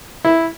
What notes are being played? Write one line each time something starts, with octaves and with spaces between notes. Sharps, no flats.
E4